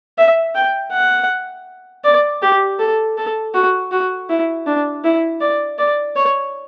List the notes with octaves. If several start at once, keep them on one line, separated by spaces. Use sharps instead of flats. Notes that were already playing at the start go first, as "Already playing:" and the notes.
E5
G5
F#5
D5
G4
A4
A4
F#4
F#4
E4
D4
E4
D5
D5
C#5